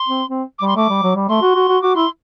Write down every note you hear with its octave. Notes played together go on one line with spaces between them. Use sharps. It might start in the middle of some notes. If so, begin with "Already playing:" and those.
Already playing: C6
C4
C4
G3 D6
C6
A3 D6
G3
F#3
G3
A3 C6
F#4
F#4
F#4
F#4 D6
E4 C6